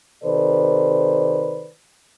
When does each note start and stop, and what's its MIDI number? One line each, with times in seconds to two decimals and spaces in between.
0.24 1.70 48
0.24 1.70 51
0.24 1.70 69
0.24 1.70 71
0.24 1.70 72
0.24 1.70 74